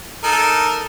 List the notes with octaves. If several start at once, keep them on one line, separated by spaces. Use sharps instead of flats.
D#4 A4 A#4